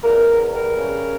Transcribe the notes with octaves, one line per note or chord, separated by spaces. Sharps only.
E2 A#4
E2
G3 A#4
C#3